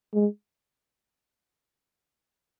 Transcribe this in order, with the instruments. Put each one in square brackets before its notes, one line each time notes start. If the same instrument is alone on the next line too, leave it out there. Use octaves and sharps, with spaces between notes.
[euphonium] G#3